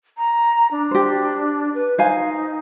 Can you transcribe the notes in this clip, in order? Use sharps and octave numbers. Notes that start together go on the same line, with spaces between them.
A#5
D4
G4 C5
B4
D#4 C5 F5 G#5